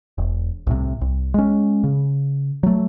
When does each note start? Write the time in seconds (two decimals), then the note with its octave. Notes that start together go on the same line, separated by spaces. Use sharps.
0.18 E1
0.67 C2 A2 C3
1.01 C2
1.34 G#3 C#4
1.84 C#3
2.63 F#3 A3